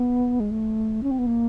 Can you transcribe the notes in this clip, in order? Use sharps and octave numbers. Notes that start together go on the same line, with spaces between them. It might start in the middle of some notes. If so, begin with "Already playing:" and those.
Already playing: B3
G#3
A3
C#4
C4
B3
A#3